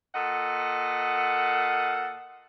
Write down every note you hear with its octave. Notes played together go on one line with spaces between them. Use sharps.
A#2 A4 D#5 F#5